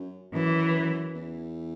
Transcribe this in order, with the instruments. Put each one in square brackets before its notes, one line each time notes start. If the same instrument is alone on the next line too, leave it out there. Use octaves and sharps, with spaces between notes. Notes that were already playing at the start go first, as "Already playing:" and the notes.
Already playing: [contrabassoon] F#2
[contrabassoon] F#2 [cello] E3
[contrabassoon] E2